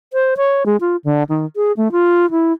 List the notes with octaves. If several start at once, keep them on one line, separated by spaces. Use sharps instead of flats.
C5
C#5
G#3
F4
D3
D#3
G#4
A3
F4
E4